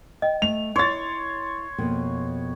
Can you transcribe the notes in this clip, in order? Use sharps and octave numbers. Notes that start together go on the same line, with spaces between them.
D#5 G5
A3 F7
E4 C#5 C6 A6
F2 B2 A#3